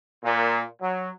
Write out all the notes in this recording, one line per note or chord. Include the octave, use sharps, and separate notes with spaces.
A#2
F#3